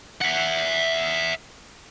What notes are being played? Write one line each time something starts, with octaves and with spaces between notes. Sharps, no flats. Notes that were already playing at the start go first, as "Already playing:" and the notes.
E5 F#5